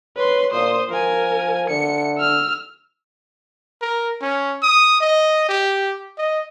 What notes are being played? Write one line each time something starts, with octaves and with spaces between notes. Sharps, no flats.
B4 C#5 C6
A#2 C5 D#6
F3 A#4 G#5
D3 C#7
E6 F6
A#4
C#4
D#6
D#5
G4
D#5